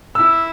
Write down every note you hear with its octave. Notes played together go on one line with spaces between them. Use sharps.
E4 E6